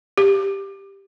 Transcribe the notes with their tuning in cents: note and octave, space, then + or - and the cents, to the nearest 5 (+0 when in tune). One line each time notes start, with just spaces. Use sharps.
G4 +5